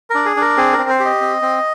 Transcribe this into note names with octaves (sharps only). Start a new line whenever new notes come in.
D4 A#4
G#4
D4 A#4
C4 G#4
A#4
C4
C5
G4
D#5
C4
C4